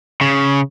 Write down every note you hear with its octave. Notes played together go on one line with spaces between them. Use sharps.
C#3